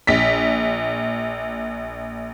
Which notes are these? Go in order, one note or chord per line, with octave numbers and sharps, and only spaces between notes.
A#1 B6